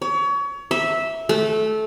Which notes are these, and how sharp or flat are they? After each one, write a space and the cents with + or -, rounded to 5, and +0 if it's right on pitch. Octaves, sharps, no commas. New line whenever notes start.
C#5 +30
E5 -10
A3 -20